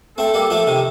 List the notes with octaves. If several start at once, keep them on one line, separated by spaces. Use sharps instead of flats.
A3 C4 A4
G3 A#3
F3 A3
C3 D#3